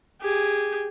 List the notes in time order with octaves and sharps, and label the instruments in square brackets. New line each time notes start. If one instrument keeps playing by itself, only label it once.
[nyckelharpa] G4 G#4